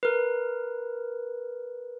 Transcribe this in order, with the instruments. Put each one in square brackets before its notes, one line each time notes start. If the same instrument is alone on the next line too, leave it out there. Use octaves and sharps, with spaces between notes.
[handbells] A#4 B4